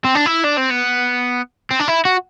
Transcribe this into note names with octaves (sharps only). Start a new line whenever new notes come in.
C4
D4
E4
D4
C4
B3
C4
D4
E4
F#4